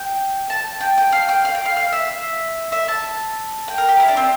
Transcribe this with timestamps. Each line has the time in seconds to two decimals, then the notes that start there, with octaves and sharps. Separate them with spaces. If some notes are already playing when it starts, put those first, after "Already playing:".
Already playing: G5
0.50 A5
0.81 G5
0.98 G5
1.13 F5
1.29 G5
1.45 F5
1.55 G5
1.65 F5
1.76 F5
1.92 E5
2.72 E5
2.88 A5
3.68 G5
3.78 A#4
3.89 G4
4.00 E4
4.08 D4
4.17 C4